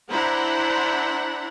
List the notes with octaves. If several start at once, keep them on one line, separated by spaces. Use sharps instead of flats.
D4 E4 C5 F#5 A#5 B5